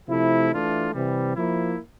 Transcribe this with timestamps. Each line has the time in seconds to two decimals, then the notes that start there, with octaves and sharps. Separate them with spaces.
0.08 C3 F3 A3 E4
0.51 E3 A3 D4 F4
0.94 C3 E3 G3
1.36 F3 A#3 E4